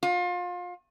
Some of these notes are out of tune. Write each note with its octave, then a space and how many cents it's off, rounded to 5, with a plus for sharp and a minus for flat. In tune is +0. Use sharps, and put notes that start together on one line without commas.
F4 +30